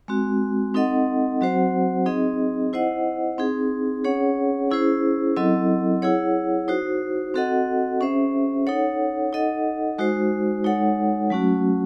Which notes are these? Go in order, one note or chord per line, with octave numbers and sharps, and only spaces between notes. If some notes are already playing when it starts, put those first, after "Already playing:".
G#3 C4 F#4
C4 D#4 A4 D#5 F#5
F#3 C4 F#4 C5 F#5
C4 D#4 G#4 D#5
E4 C5 D#5 F#5
C4 D#4 G#4
C#4 G#4 C#5 F#5
C#4 E4 G#4 C5
F#3 C4 E4 A4 D#5
E4 G#4 C#5 F#5
D#4 F#4 C5
C4 F#4 A4 D#5 F#5
C#4 G#4 C5 E5
D#4 A4 C#5 F#5
D#4 A4 D#5 F#5
G#3 D#4 F#4 C5
G#3 D#4 A4 C#5 F#5
F#3 A3 C#4 F#4